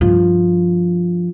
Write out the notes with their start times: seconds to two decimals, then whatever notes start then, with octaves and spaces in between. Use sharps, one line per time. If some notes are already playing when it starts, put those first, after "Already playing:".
0.01 G2 F3